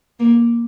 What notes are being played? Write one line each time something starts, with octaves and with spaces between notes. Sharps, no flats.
A#3